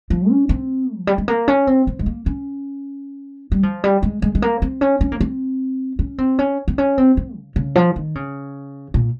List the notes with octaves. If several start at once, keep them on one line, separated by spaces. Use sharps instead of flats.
F3
C#4
C4
F3
G3
G#3
A#3
C#4
C4
C4
G#3
A#3
C#4
G3
F3
G3
G#3
G#3
G#3
A#3
C4
C#4
C#4
A#3
C4
C#4
C4
C#4
C4
C#4
C4
C4
C#3
C#3
F3
D#3
C#3
A#2